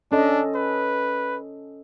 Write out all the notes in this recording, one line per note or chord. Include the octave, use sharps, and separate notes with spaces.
C#4 D4 A4 D#5
B4